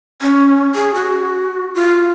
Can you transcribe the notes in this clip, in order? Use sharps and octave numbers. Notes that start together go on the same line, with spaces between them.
C#4
G#4
F#4
F4